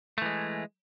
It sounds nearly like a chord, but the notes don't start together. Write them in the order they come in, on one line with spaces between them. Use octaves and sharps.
A3 E3 G#3